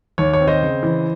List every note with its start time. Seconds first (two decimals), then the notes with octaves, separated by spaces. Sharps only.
0.18 D#2 C#5
0.34 C#5
0.40 C4
0.47 C5 D#5
0.62 C#3
0.83 E3